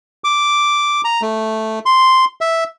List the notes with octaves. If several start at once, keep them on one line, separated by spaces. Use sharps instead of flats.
D6
A#5
A3
C6
E5